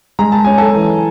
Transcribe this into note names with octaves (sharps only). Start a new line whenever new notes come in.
G#3 A#5
A5
C#4 G#5
A4 A5
E3